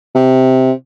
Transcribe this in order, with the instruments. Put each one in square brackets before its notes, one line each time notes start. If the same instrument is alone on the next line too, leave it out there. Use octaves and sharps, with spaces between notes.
[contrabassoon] C3